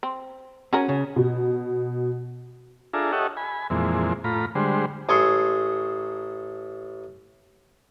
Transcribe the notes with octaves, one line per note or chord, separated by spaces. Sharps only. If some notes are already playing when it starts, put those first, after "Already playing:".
C4
C#4 F#4 G#4 A#4
C#3
B2
D4 F4 G#4 A4 E5 A#5
G4 A4 C#5 D#5 E5 F#5
G#5 B5
F2 A#2 E3 G#3 C4
A2 F4 A#5 B5
D3 G3 G#3 C5
A1 G#4 A4 C6 C#6